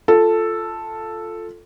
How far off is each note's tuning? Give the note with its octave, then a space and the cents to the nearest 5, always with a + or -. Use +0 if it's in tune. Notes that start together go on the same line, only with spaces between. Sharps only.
F4 +0 A4 +0